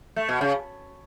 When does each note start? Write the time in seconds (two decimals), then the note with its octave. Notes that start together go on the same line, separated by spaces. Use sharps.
0.16 A3
0.29 B2
0.41 C#3